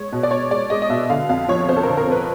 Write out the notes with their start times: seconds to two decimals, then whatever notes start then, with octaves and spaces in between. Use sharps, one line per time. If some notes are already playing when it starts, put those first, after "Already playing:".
Already playing: G#3 C#5
0.12 B2
0.23 D5
0.31 B2 C#5
0.51 G#3 D5
0.70 G#3 D#5
0.82 D#5
0.90 B2 E5
1.10 D3 F5
1.29 F2 F5
1.48 F3 C#5
1.69 F2 C5
1.77 A4
1.83 D3 A#4
1.97 A#4
2.07 F2 B4